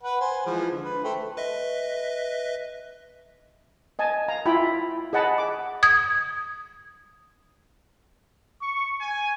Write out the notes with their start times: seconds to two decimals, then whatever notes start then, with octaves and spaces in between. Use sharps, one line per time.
0.03 B4 F#5
0.20 C5 G#5
0.46 E3 F3 G#3
0.72 D3
0.84 B4
1.04 A3 C5 G5
1.37 B4 D#5 E5
3.99 D#5 G#5 A5
4.28 F5 A#5
4.46 E4 F4 G5 B5
5.13 G#4 D#5 F#5 A5 B5
5.38 D6
5.83 D#6 G#6
8.61 C#6
9.00 G#5